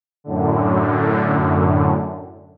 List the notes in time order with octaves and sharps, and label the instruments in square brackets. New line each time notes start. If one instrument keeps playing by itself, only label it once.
[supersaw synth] F#2 A2 D3